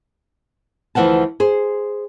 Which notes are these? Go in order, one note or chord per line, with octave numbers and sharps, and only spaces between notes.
D2 E3 F3 F#5 A5
G#4 C5